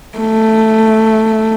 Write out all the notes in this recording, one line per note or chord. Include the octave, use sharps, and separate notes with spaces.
A3